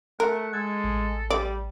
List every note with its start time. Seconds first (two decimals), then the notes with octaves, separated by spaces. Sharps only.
0.20 A3 A#4 F#5
0.53 G#3 A4 G#6
0.84 A1
1.30 G3 D5